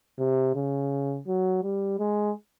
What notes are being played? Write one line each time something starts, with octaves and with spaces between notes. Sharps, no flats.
C3
C#3
F#3
G3
G#3